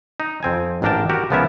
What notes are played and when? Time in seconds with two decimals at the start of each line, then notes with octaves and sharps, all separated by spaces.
0.20 D#4
0.43 F2 C4 G#5
0.82 A1 G#2 D4 A#4 G5 A5
1.09 F#4 G4 A#4
1.30 C#2 F3 B3 C#4 A#4 E5